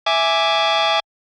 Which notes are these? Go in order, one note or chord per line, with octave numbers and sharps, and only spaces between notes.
E5 G#5 D6